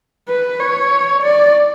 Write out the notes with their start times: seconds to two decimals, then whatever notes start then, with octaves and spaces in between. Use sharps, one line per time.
0.28 B4
0.59 C#5
1.22 D5